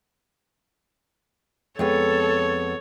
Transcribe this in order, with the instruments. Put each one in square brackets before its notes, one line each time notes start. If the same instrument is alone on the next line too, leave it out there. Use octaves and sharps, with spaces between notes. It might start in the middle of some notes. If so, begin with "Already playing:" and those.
[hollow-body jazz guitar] F2 G#3 B3 [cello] A4 [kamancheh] C#5